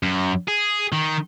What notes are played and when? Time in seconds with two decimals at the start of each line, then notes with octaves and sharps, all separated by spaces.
0.03 F#2
0.48 G#4
0.92 D#3